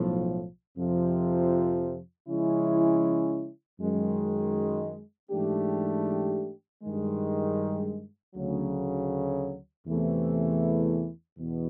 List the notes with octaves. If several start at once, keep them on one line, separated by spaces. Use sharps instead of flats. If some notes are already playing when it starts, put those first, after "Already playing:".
Already playing: B1 A2 F3
F2 C3 F3
C#3 F3 G#3 C#4 E4
F#2 D#3 G#3
G#2 E3 A3 D4 G4
G2 D#3 G#3
D2 C#3 F#3
E2 C3 E3 A3
E2 B2